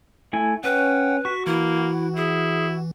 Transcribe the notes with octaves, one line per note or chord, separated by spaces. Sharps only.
A3 E4 G#5
C#4 B4 F#5 G5
F#4 C#6 B6
E3 A#3 E4
E4 G#4